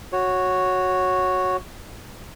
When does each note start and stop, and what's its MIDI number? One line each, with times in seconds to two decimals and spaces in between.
0.13 1.57 66
0.13 1.57 73